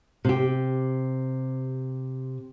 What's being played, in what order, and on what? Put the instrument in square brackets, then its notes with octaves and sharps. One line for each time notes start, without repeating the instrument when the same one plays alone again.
[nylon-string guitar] C3 G4